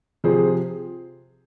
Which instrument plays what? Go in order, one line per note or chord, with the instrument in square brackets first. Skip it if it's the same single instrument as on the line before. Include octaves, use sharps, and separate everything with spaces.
[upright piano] C3 F3 G#4 C5